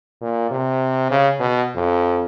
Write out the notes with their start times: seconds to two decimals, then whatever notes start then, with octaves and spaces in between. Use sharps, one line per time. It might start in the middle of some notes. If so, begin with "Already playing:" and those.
0.21 A#2
0.50 C3
1.10 C#3
1.39 B2
1.75 F2